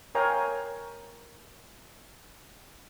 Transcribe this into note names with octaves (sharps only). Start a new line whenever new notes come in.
A#4 C#5 F5 G5 G#5 A#5